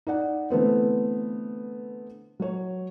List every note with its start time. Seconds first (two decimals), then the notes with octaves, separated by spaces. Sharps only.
0.07 D#4 D5 F#5
0.50 D3 E3 A3 B3 C4
2.40 F#3 C#5